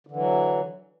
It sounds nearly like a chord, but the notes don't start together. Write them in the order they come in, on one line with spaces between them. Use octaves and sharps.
D3 E3 F#3